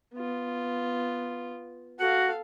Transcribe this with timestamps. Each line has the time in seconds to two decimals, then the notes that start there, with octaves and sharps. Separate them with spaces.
0.14 B3 F4
2.00 F#4 A4 F5 F#5